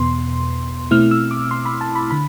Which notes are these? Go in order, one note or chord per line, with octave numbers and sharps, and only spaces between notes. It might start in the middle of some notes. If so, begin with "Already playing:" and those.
Already playing: E2 B2 B3 C6
B2 A3 C4 E4 F6
E6
D6
C6
B5
A5
B5
D3 B5